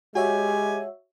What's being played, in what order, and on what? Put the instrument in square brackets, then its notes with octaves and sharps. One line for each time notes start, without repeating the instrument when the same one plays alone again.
[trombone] G#3 [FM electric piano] F#4 C#5 E5 [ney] G4 [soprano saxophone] G#5